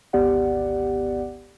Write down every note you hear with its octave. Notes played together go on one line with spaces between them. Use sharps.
G#1 D2 B3 G4 D5 F#5